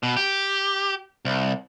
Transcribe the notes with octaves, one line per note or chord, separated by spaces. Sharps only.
B2
G4
C2